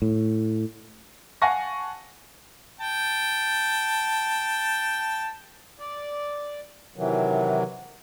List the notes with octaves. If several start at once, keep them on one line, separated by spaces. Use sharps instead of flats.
A2
F5 F#5 G#5 A5 C#6 A#6
G5 A5
D5
C3 D#3 E3 F#3